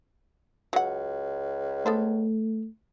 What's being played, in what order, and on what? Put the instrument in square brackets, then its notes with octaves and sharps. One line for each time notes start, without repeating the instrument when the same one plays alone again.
[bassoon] C#2 [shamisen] F#3 F#5
[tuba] A3 [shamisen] B3 A4 C5